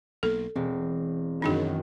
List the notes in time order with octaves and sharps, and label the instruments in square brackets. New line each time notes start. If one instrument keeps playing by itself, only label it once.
[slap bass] B1 A#3 [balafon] A4
[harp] E1 [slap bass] C4
[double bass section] F#2 D#3 [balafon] D4 D#4 G#4